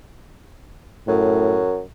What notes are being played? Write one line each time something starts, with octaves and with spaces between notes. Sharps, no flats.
F#2 A2